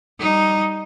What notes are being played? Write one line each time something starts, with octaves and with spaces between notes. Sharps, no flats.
G3 D#4